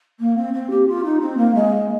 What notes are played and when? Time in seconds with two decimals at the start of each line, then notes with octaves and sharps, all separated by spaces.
0.20 A#3
0.37 C4
0.53 C4
0.70 G4
0.87 F4
1.04 D#4
1.21 C4
1.37 A#3
1.54 G#3